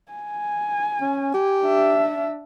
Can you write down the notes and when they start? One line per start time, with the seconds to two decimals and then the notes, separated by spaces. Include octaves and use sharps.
0.12 G#5
1.01 C#4
1.34 G4
1.63 D4 E5